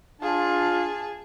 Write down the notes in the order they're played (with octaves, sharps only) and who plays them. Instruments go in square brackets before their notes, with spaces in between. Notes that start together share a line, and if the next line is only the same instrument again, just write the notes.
[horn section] D4 F4 [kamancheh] G#4 A5